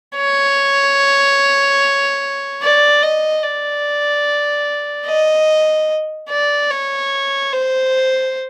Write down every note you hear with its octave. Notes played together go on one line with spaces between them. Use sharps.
C#5
D5
D#5
D5
D#5
D5
C#5
C5